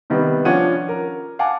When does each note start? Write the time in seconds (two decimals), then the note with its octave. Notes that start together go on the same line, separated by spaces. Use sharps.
0.10 C3 D#3 G3 B3
0.45 F3 C#4 D4 F4 F#5 D#7
0.89 A#4
1.39 F5 F#5 G#5 A5 D6